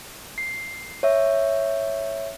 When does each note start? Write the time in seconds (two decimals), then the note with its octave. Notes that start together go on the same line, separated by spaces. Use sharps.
0.38 C7
1.03 C#5 E5